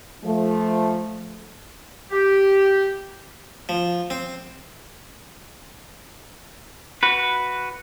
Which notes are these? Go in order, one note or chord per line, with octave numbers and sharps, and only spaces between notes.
F3 A3
G4
F3
C4
F#4 B4